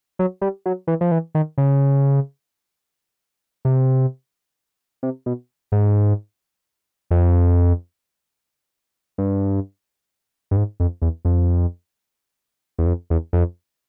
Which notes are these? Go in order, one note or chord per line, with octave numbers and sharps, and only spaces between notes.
F#3
G3
F#3
E3
F3
E3
D#3
C#3
C3
C3
B2
G#2
F2
G2
G2
G#2
F2
E2
F2
E2
F2
E2
F2